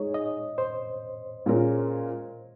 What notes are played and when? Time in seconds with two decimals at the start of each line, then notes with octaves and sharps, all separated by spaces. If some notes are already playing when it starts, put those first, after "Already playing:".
Already playing: G#3 D#4 G#4 C#5
0.14 D#5
0.58 C5
1.46 A#2 G#3 C#4 F4 A#4